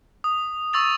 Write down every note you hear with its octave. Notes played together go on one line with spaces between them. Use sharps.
D#6
C#6 E6 A6 F7